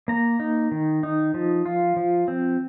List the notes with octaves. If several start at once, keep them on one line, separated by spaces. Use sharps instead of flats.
A#3 A#5
D#4
D#3
D#4
F3
F4
F3
C4